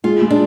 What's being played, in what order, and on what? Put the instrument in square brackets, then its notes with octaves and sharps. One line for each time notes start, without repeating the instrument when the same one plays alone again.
[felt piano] G#3 [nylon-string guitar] F4
[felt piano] G#3
[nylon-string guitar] D4